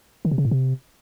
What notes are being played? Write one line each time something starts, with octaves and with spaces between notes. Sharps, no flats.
D#3
C3
C#3
A2
C3